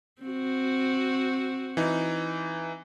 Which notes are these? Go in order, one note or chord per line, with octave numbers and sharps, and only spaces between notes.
C4 F#4
E3 D#4